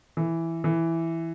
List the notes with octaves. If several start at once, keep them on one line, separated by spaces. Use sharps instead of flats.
E3
E3